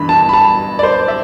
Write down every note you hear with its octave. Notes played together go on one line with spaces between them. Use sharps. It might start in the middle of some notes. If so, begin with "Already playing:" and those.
Already playing: G2 E3 B5
A5
B5
A5
D5
C5
E5